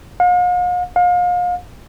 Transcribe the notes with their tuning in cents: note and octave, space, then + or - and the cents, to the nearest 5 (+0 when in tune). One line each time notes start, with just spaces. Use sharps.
F5 +45
F5 +35